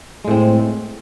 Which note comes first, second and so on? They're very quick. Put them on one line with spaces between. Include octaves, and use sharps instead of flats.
G#3 A2 C4